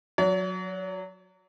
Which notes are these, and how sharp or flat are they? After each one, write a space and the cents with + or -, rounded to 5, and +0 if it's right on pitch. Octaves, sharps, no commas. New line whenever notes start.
F#3 -15 C#5 +45